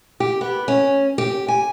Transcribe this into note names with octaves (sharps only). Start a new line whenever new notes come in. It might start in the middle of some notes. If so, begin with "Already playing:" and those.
G4
B3
C#4
G4
G#5